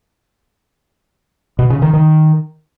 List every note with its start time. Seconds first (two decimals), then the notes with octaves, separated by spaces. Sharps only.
1.59 B2
1.70 C#3
1.82 D#3
1.94 D#3